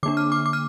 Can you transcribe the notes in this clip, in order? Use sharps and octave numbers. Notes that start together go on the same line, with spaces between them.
D3 A#3 D4 D6
F6
D6
D6
F6